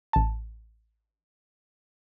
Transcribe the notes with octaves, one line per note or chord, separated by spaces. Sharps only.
A1 A5